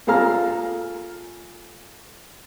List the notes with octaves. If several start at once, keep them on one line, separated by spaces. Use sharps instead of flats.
A#2 G#4 A4 F5 A#5 F6